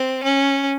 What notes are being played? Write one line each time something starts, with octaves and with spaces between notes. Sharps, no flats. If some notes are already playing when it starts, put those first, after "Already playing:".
Already playing: C4
C#4